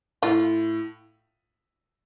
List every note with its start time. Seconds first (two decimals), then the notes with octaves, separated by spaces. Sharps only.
0.23 A2 F4